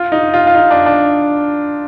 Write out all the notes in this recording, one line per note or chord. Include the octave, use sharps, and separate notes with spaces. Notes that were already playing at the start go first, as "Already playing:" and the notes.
Already playing: F4
D#4
F4
F4
D#4
D4
D4